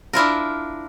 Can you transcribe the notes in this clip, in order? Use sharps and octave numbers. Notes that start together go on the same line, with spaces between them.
D4 E4 F4 A#4